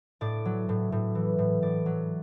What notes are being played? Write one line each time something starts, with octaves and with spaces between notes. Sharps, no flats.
A2 D5
F#3
A2
A2
E3
A2
A2 D5
F#3